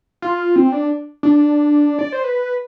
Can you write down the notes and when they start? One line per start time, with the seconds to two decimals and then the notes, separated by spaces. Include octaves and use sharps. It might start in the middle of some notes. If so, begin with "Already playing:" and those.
0.22 F4
0.56 C4
0.72 D4
1.23 D4
1.99 D5
2.12 C5
2.24 B4